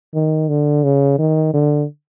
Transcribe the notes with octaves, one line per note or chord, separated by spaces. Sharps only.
D#3
D3
C#3
D#3
D3